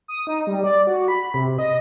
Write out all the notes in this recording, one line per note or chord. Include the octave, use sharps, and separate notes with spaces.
D#6
D#4
G3
D5
F#4
B5
C3
D#5